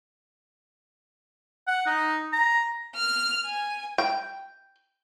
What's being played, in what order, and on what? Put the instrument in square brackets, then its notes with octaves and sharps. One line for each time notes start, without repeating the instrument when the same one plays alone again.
[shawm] F#5
D#4
A#5
[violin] F6
G#5
[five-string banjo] G5